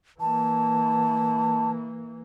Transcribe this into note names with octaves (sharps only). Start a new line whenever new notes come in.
E3 A#3 A5